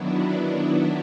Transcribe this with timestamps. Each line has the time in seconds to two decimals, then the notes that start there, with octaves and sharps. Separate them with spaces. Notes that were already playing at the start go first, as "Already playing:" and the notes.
Already playing: D#3 F#3 B3 D4 E4
0.57 E4